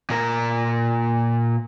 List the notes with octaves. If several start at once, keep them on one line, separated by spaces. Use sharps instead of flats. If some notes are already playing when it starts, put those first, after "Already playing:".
A#2 A#4